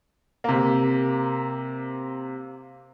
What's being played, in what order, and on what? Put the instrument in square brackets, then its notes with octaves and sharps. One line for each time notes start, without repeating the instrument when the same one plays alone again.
[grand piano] C3 A#3